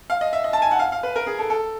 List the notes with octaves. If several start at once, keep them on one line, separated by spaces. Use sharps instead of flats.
F5
D#5
E5
D#5
A5
G#5
F#5
F5
F5
B4
A#4
G#4
A4
A4